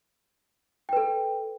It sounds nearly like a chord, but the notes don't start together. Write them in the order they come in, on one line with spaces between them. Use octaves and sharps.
G5 B4 A4